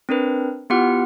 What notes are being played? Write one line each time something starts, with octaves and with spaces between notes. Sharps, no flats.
C4 D4 A#4 B4
B3 E4 F4 G4 F#5 F6